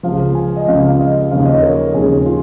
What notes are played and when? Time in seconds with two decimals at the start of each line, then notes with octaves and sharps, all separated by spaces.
0.03 C#2 C#3 F3 F5
0.35 G#5
0.56 D#5
0.67 C#2 C#3 F3 F5
0.88 F5
0.99 D#5
1.31 D#2 C#3 F3 F5
1.45 D#5
1.54 C#5
1.62 A#4
1.94 D#2 C#3 F3 G#4
2.26 F4